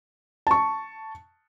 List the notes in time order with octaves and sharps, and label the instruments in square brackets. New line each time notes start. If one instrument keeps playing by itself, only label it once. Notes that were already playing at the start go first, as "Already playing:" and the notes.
[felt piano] A5 C#6